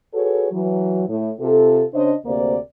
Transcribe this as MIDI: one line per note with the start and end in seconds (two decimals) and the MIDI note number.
0.14 0.49 66
0.14 0.49 68
0.14 0.49 69
0.14 0.49 71
0.14 0.49 73
0.53 1.04 52
0.53 1.04 54
1.09 1.31 45
1.41 1.84 48
1.41 1.84 65
1.41 1.84 69
1.94 2.13 49
1.94 2.13 62
1.94 2.13 72
1.94 2.13 73
1.94 2.13 75
2.26 2.57 38
2.26 2.57 48
2.26 2.57 58
2.26 2.57 72
2.26 2.57 74